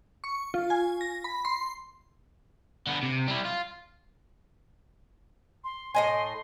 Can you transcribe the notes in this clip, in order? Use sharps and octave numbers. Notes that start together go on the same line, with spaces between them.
C#6
F4
G#5
A#6
B5
C6
D3 B3
C3
G3 E4
F4
C6
A2 D#5 G#5 C6